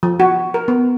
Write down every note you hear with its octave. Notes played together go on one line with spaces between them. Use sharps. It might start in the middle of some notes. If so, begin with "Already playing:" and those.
F3
F#4
A#4
B3